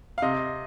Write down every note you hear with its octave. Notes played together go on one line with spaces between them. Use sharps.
F5
C3 D#5